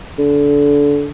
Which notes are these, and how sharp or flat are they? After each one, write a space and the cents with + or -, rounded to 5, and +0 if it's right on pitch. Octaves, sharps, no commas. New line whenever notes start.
D3 -25